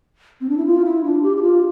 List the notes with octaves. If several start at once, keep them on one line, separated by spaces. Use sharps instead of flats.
C4
D4
E4
F4
E4
D4
G4
G4
F4